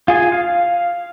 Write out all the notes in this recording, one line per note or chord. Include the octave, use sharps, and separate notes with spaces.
F4 G#4 G#5
F5